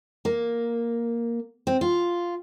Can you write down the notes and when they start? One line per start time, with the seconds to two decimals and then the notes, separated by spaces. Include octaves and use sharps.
0.25 A#3
1.67 C4
1.81 F4